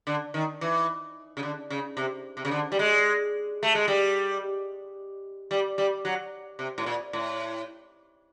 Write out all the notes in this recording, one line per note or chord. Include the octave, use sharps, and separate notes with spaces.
D3
D#3
E3
C#3
D3
C#3
C3
C3
C#3
D3
G3
G#3
A3
G#3
G3
G3
G3
F#3
C3
A2
A#2
A2